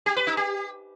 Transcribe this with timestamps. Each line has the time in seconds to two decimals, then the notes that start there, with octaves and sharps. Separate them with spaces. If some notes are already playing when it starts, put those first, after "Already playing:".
0.06 G4
0.16 B4
0.27 D#4
0.37 G4